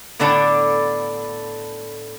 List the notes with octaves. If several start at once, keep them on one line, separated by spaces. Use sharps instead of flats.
A2 D3 B3 D4 A4 D5